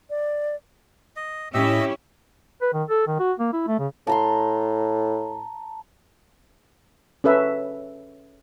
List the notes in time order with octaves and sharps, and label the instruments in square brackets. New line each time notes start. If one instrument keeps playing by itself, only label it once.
[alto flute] D5
[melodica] D#5
[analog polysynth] A2 [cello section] C#4 E4 [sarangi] G4 [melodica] D#5 E5 E6
[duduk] B4
D#3
A4
D#3
F#4
A#3
E4
A3
C#3
[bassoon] A2 [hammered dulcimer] A5 A#5 C6
[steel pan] C#4 A4 B4 E5